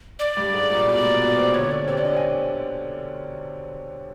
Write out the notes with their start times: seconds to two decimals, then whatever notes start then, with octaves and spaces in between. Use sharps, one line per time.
0.19 D5
0.37 G2 G3
0.53 G#2 G#3
0.70 A#2 A#3
0.86 B2 B3
1.03 A#2 A#3
1.21 B2 B3
1.37 C3 C4
1.54 D3 D4 C#5
1.71 D5
1.84 C#4
1.87 C3 C4 D5
1.97 D4
2.04 C#4 D#5
2.13 C4
2.17 G#5